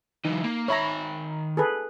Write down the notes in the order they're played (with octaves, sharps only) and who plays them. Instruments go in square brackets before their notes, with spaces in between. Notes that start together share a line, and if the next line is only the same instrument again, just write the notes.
[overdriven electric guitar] E3 F#3 [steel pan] D#4
[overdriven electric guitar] A#3
[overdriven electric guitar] D#3 B5 [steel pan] C#5 E5 A#5
[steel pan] G#4 A4 B4